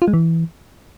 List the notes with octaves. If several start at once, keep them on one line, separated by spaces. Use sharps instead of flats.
F4
G#3
E3